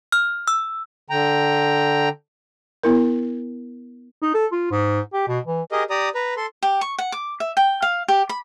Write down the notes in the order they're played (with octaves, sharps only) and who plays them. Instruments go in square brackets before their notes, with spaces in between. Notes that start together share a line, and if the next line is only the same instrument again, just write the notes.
[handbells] F6
E6
[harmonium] D3 G5 A#5
[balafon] B3 E4 A#4
[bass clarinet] D#4
A4
F4
G#2
G4
B2
E3
[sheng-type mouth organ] G4 G#4 A#4 D#5
G4 D5 A#5 D#6
B4 A#5
A4 C6
[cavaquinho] G4
C#6
F#5
D6
E5
G5
F5
G4
B5